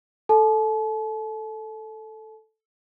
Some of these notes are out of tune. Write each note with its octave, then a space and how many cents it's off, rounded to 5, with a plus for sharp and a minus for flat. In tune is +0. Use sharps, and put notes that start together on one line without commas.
A4 +0 A5 -40